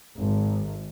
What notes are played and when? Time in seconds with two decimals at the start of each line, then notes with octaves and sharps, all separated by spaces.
0.16 G#1